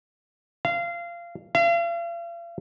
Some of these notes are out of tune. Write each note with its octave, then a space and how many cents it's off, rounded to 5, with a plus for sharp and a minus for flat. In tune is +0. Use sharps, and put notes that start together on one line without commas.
F5 -20
F5 -40